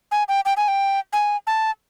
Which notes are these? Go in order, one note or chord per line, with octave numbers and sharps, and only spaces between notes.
G#5
G5
G5
G#5
G5
G#5
A5